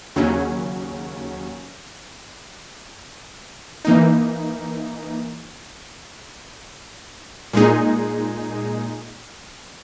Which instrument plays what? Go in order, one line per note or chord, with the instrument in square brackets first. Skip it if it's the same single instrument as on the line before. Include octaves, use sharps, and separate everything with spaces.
[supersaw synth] D#2 C#3 F#3 C#4
E3 A#3 D#4
A#2 G#3 D#4 G#4